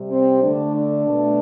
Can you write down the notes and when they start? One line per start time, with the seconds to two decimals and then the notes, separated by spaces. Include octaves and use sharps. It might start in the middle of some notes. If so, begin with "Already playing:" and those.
Already playing: C3 G3
0.11 C4
0.42 D3 A3 D4
0.75 D4
1.07 B2 A3